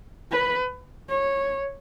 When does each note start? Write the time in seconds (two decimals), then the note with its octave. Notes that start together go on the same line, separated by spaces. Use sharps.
0.31 B4
1.09 C#5